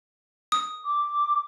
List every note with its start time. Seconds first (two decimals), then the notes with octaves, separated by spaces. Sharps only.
0.52 D#6
0.85 D6